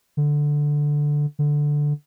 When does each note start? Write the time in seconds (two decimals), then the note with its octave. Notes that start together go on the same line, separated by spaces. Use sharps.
0.17 D3
1.39 D3